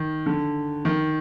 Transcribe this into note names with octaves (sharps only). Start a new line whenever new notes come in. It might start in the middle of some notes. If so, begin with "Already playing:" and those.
Already playing: D#3
D3
D#3